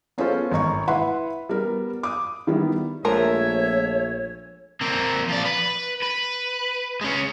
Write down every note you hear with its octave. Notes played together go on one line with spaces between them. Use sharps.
B3 C#4 F4 G#4 A4 C5
G#1 D#5 A#5 C#6
E4 B4 E5 F#5 B5 C6
G3 B3 A#4
D6 D#6
D#3 G3 B3 E4
A#1 F3 G#3 A3 A#4 C#5 E5
A#3 C4
F3 D5
B4
B4
G#3 C#4